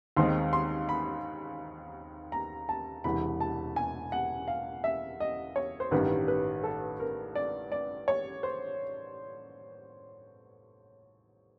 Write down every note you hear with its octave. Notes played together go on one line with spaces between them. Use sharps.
D#2 D#3 G#3 C4 D#4 C6
C6
B5
A#5
A5
E1 E2 C3 E3 B5
A5
G#5
F#5
F5
E5
D#5
C#5
C5
A1 G2 D#3 G3 B4
B4
A4
A#4
D5
D5
C#5
C5